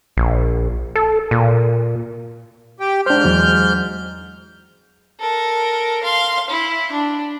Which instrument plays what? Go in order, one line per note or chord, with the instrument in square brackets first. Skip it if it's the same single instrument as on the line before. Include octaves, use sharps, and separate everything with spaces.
[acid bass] A#1
A4
A#2
[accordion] G4 G5
[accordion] G#2 F6 G6 [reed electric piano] D4 C5
[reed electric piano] E2 F#3
[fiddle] A4 A#4
F5 C6
E4
D4